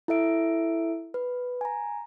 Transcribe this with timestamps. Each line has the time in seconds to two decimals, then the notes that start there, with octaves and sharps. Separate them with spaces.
0.08 E4 A4 E5 D7
1.14 B4
1.61 G#5 A#5